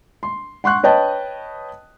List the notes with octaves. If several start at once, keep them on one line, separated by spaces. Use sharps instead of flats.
C6
F#5 C6 C#6 F#6
B4 C#5 D#5 G5 A5